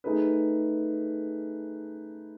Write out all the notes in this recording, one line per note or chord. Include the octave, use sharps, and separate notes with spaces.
A3 D#4 G#4 B4